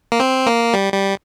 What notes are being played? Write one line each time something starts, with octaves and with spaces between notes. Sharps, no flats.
A#3
C4
A#3
G3
G3